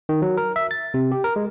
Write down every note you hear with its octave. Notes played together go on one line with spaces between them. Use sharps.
D#3
F#3
A#4
E5
A6
C3
G4
A#4
G#3